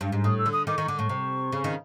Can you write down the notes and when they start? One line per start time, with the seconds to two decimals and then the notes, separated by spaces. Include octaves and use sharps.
0.01 G2
0.12 G#2
0.24 A2 D#6
0.39 E6
0.46 D3
0.53 D#6
0.67 D#3 D6
0.77 D#3 C#6
0.88 D3 D6
0.98 A2 C#6
1.09 C3
1.52 C#3
1.64 D#3